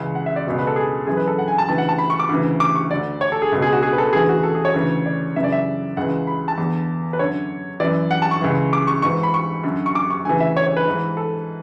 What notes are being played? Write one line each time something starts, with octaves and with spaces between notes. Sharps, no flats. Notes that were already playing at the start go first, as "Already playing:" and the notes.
Already playing: C#2 C#3 E3
F#5
E5
D5
C#2 B2
B4
A4
G#4
F#2 E3 G#4
B4
A4
F#5
G#5
A5
D2 C#3 E3 A5
F#5
A5
B5
C#6
D6
D2 C#3 E3
D6
C#6
D2 D3 D5
C#5
A4
G#4
C#2 B2
G#4
F#4
G#4
B4
A4
D2 C#3 E3 G#4
F#4
A4
G#4
C#5
D2 C#3 E3
D5
F#2 C#3 E3 E5
D5
E5
C#2 C#3 E3 F#5
B5
A5
E2 D3
B4
F#2 D3 C#5
F#2 E3 D5
F#5
A5
C#6
C#2 C#3 E3
D6
C#6
G#2 E3 C#6
B5
C#6
F#2 D3
C#6
D6
C#6
D2 C#3 E3 G#5
E5
C#5
C#5
B4
G#2 E3
A4